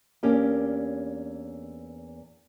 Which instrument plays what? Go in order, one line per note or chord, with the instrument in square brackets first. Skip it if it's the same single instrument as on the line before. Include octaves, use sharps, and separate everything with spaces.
[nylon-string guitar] E2 A#3 C#4 D4 G4